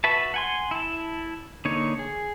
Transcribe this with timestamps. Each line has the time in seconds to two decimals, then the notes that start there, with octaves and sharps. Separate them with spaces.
0.04 F#4 B4 E5 A5
0.34 F#5 G#5 C6
0.71 E4 A5
1.65 D3 A#3 D#4 C#5
1.99 G#4